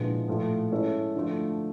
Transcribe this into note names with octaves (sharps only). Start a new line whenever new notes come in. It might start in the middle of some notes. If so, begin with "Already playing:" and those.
Already playing: A#2 D3 F3 G#3 B3 E4
A2 F3 A3
G#3 C#4 E4 A4
D3 F3 A3